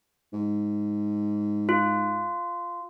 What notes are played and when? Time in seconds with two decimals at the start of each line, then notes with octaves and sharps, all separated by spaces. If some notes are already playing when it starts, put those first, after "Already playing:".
0.33 G#2
1.69 F4